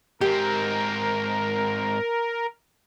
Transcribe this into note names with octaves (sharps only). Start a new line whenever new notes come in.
G#2 C4 G4 A#4